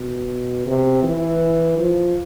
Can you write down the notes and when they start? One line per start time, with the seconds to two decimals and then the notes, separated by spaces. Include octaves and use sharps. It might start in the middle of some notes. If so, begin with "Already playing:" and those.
Already playing: B2
0.66 C3
1.03 E3
1.79 F3